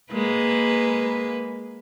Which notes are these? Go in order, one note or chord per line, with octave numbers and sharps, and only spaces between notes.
G#3 A#3 B4